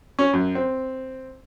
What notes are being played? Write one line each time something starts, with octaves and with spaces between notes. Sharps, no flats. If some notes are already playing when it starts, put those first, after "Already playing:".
C#4
F#2
C4